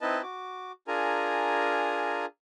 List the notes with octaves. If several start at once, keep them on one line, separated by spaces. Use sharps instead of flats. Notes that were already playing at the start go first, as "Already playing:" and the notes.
C4 D#4 E4 B4 D#5 A5
F#4 D6
D4 F4 G#4 A#4 G#5 A#5